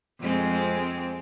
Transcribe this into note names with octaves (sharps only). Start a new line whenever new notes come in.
F2 G#3 C4